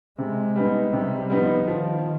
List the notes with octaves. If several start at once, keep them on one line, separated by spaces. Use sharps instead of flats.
C3 G#3
G3 B3 D#4
C3 G3
F3 G3 B3 D#4
D#3 F3